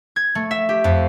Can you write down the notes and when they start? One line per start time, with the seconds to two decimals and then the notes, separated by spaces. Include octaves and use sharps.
0.16 G#6
0.35 A3
0.51 E5
0.69 G4
0.84 F2